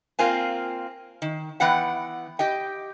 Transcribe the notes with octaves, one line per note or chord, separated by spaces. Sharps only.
A#3 C4 F4 G#5
D#3
E3 B3 F#5 G5
G4 D#5 G5